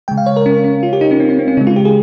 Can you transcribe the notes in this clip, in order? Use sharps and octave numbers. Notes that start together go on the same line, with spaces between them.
C#3 G#3 G5
F5
C#5
A#4
C#4
C#4
F4
G4
D#4
C#4
C4
C#4
C4
C#4
C#3 G#3 D#4
F4
G4
G#4